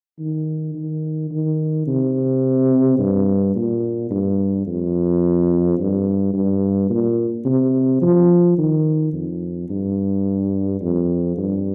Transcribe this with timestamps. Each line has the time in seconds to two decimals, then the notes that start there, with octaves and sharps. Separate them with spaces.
0.19 D#3
0.75 D#3
1.31 D#3
1.87 C3
2.99 G2
3.55 A#2
4.11 G2
4.66 F2
5.79 G2
6.34 G2
6.90 A#2
7.45 C3
8.02 F3
8.58 D#3
9.13 F2
9.70 G2
10.81 F2
11.37 G2